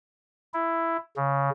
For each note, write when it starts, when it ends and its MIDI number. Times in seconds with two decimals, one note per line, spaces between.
0.54 0.97 64
1.17 1.50 49